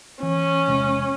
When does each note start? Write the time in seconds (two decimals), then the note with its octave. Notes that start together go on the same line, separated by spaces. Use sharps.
0.23 E3 C#4
0.67 E1 C3 G#3